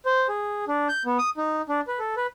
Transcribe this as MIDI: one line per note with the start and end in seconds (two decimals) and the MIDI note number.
0.06 0.27 72
0.28 0.65 68
0.68 0.88 62
0.89 1.03 91
1.05 1.18 59
1.19 1.30 87
1.37 1.62 63
1.69 1.81 62
1.88 1.99 71
1.99 2.15 69
2.17 2.27 71